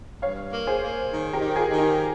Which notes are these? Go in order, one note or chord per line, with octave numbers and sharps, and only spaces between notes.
G2 C#5 F5
A#3
G#4 C5
A#3
D#3
G4 A#4
D#3
F4 G#4
D#3
D#4 G4